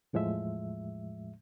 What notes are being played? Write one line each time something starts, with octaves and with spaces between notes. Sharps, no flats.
E2 A2 F3 G#3 E5